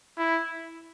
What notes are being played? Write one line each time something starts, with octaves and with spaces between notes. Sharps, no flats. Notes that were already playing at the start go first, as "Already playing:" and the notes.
E4